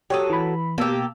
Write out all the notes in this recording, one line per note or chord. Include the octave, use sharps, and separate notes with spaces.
F#3 G4 A4 C#5 D#6
E3 B5
B2 A#3 G4 A5 E6